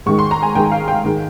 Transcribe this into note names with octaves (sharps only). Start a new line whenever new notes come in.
G#2 D#3 G#3 C#6
C6
A#5
G#5
G#2 D#3 G#3 G5
F5
G5
G#2 D#3 G#3